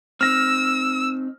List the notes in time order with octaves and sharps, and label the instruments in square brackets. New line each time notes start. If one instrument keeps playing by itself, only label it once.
[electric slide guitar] C4 D#4 [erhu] E6 [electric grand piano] F6 A#6